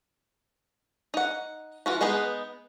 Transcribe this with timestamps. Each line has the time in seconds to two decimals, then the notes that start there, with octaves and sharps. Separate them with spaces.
1.14 D#4 F#5
1.86 E3 F4 F#4
2.01 G#3 B3 D#4 G#4 B4